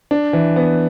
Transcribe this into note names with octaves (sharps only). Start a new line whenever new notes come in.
D4
E3
B3